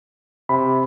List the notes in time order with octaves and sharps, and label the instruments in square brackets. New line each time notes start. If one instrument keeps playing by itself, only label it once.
[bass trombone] C3 [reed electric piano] B5